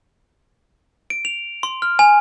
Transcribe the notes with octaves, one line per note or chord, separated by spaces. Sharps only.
D7
F7
C6
F6
G#5